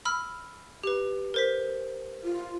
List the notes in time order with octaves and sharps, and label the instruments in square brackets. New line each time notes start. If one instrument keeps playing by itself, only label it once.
[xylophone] B5 E6 F6
G4 B4
A#4 C5 B6
[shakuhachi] F4